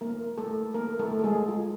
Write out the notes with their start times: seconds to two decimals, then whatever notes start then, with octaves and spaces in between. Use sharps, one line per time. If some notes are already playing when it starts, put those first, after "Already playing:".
0.01 A#3 A#4
0.38 A3 A4
0.74 A#3 A#4
0.99 A3 A4
1.19 A4
1.24 G#3 G#4
1.48 F4